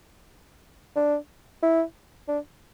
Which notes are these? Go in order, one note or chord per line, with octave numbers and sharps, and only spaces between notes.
D4
E4
D4